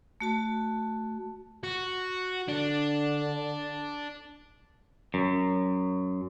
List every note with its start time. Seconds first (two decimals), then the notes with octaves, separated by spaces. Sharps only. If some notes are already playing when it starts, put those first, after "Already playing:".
0.21 A3 F#4 A5
1.63 F#4
2.49 D3 D4
5.14 F#2